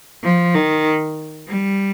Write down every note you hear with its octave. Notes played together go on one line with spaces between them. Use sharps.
F3
D#3
G3